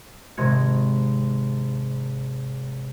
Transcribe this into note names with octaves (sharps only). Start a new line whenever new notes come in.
G#1 C3 D#4 G#6 C#7